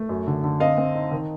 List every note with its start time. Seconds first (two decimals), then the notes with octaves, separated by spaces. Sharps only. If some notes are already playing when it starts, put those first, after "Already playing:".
Already playing: A3
0.09 F#2
0.27 D3
0.44 D3
0.60 C4 D#5 F5
0.77 C4
0.95 D#4
1.11 D#3